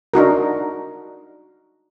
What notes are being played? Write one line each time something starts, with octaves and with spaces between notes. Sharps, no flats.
D4 D#4 F#4 A#4